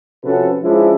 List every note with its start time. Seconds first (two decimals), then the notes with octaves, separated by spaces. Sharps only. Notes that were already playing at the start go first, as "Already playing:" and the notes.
0.24 C3 F3 C#4 F#4 A4 B4
0.62 F3 G#3 C#4 D4 E4